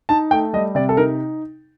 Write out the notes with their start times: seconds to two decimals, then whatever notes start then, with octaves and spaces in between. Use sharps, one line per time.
0.09 D#4 A5
0.31 A3 G5
0.53 G3 D#5
0.75 C3 D5
0.89 A4
0.97 D#4 A#4